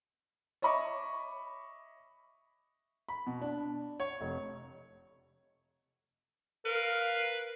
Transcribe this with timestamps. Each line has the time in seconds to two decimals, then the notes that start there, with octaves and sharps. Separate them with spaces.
0.62 C#5 D#5 E5 B5 C#6 D6
3.08 B5
3.27 B2
3.41 D4
4.00 C#5
4.21 F1
6.65 A#4 B4 F5